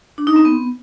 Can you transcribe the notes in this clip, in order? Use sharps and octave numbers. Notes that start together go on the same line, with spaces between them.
D4
D#4
C4
B3